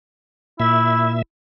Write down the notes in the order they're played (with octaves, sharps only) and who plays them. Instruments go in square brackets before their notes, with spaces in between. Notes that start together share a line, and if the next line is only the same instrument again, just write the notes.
[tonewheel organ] A#2 E5 [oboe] E4